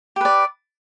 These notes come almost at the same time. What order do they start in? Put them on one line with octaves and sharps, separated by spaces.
G4 B4 D5